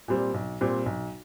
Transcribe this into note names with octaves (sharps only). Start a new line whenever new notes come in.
A#2 G3 C4
B1
A#2 G3 C4
B1